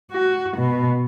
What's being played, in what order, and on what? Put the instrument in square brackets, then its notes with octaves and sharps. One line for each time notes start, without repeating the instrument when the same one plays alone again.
[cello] F#4
B2